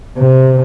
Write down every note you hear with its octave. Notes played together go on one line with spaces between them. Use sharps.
C3